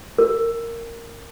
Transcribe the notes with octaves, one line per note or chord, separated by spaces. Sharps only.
A#4